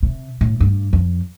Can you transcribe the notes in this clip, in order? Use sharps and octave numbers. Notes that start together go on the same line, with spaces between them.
C3
A2
G2
F2